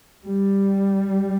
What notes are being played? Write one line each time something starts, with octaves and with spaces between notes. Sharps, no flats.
G3